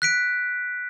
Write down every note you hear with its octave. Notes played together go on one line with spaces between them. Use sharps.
F#6 B6 D7